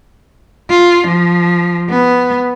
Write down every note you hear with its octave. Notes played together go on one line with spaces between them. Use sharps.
F4
F3
B3